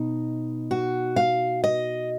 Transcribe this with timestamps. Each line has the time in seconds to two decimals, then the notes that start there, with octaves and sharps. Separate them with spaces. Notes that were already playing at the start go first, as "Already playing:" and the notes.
Already playing: B2 D#4
0.71 F#4
1.16 F5
1.64 D#5